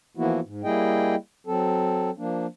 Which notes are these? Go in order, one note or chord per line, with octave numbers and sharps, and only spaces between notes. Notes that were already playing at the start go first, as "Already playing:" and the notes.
E3 F3 A#3 B3 E4 F#4
G#2
G3 A#3 E4 G#4 D#5 G5
F#3 C4 A4
F3 A#3 D4